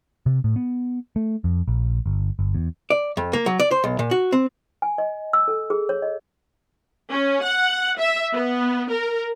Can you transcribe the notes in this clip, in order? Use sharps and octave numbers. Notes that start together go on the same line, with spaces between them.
C3
A2
B3
A3
F2
A#1
G1
G1
E2
D5
F2
A#3
F#3
D5
C5
B1
A#2
F#4
C4
G#5
D#5
E6
A4
G#4
C#5
D#5
C#4
F#5
E5
B3
A#4